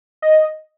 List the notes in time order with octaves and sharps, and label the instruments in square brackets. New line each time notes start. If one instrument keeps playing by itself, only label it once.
[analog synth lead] D#5